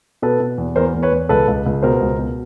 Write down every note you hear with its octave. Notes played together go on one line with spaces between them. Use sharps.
B2 A4 B4
B2
E2
E2 A#4 C5
E2
B4 C#5
E2
C#2 A4 B4
C#2
C#2
B2 A#4 C5
C#2
B2